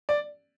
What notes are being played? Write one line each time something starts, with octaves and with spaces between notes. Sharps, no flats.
D5